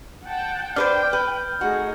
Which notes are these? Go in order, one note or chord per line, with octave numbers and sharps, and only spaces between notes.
F#5 G5 A5
D4 B4 C5 G5 F6 G6
B4
A3 D#4 F#4 G#4